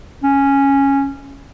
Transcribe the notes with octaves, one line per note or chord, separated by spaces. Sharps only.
C#4